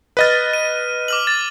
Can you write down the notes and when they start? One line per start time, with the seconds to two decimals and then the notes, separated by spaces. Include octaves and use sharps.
0.17 B4 D#5 F6 A6 D#7
0.53 D#7
1.08 D6 F6 F#7
1.27 A6